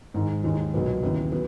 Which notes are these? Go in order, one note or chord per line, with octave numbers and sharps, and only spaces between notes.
G#2 D#3 G#3
D#2 D#3 G#3
B1 A#2 F#3 B3
D#2 C#3 E3 B3
F#3 B3